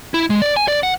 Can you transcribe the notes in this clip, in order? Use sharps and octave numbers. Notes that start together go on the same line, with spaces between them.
E4
G#3
D5
G#5
D5
F#5